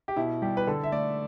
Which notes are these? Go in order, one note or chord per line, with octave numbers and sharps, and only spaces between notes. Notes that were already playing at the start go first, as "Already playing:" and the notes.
G4
B2 E4
G3 G4
B4
D3 A4
E5
A3 D5